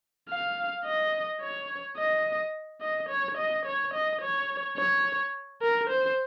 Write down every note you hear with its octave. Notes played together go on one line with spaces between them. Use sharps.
F5
D#5
C#5
D#5
D#5
C#5
D#5
C#5
D#5
C#5
C#5
A#4
C5